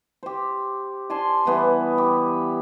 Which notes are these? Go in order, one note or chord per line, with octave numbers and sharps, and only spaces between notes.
G4 C5
D5 G#5 A5 C6
E3 G3 B3 E4
G4